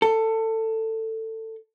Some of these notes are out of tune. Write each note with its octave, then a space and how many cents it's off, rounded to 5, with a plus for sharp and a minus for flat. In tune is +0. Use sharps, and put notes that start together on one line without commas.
A4 +20